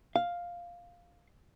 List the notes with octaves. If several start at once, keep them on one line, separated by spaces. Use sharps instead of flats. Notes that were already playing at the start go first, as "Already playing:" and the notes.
F5